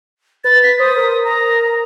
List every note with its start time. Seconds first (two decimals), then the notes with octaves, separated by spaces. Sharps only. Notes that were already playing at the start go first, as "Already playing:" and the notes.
0.44 B4 A6
0.63 B6
0.79 C5 D#6
0.96 A#4
1.25 A#5